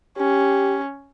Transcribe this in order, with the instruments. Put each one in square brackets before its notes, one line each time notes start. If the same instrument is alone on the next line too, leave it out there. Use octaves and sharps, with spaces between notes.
[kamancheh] C#4 [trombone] G4